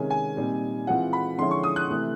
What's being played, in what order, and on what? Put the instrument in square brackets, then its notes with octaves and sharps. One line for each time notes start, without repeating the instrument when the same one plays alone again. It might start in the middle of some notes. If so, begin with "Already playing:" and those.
Already playing: [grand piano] C3 D#3 G#3 C#4 G#5
G#5
A#2 G3 C4 D#4
E3 G#3 C4 F4 F#5
B5
D3 F3 G#3 C#4 E4 C6
C#6
D#6
F#6
C3 E3 A3